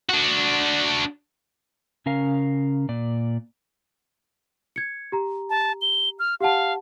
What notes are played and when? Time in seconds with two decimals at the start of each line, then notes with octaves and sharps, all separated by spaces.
0.09 D4 F#4
2.06 C#3 C#4 A#4 F5
2.89 A#2 D5
4.76 G#6 C#7
5.12 G4 A#5
5.50 A5
5.82 G7
6.19 F6
6.41 G4 F5 F#5 A5